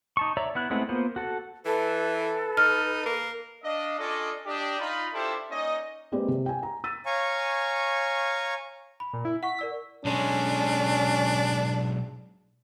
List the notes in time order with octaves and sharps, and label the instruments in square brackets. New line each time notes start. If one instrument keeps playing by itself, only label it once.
[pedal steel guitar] D#4 A5 C#6
C#5 D5 E5 A#5
B3 E4 F#6
G#3 A3 B3 C4 E4
A#3 B3 F4 C5
F#4 A4
[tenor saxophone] E3 [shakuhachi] A4 [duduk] B4
[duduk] B4
[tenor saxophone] D#4 [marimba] F6
[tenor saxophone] A#3
[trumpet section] D4 D#5 F5
C#4 D4 F4 A4 D5 D#5
D4 G4 D#5
D#4 F4 B5
D4 E4 F4 G4 A4 C5
A#3 C#4 D#4 D5 D#5
[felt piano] G#3 A#3 C4 G4 B4 D5
C3
G5 G#5
A#5
E6 A6 B6 D#7
[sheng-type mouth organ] C#5 F5 G#5 A#5 C#6
[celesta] B5
[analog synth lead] A#2
E4
[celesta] F#5 C#6 [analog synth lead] B6
[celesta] A#4 D5 E6
[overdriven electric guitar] B1 G#3 [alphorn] C#4 [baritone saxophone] D4